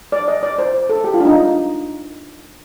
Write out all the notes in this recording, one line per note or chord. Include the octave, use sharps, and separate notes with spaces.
D5
D#5
D5
C5
A4
G4
F4
D4
D#4